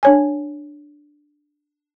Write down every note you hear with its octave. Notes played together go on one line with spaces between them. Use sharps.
D4 C#5 G#5